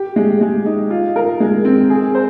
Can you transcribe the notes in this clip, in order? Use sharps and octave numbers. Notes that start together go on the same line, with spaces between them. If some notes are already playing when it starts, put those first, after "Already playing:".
Already playing: G4
G#3
G#3
D#4
F4
A#4
G#3
C4
G#4
C5